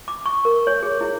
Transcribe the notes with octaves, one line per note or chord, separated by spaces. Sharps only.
D6
C#6
A#4
C#5
G#4
E4